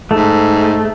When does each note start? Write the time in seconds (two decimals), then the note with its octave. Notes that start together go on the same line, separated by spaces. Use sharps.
0.11 G#2 A3